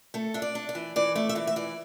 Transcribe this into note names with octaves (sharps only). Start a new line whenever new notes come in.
A3 A4
D4 E5
D5
D4
D5
E3
E3 D5
A3 D5
E5
E3 D5
E5
E3 D5